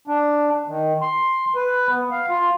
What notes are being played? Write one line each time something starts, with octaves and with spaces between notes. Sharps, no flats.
D4
D#3
C6
B4
B3
F5
F4